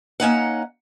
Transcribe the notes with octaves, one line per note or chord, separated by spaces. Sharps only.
A#3 C#4 D#4 F#5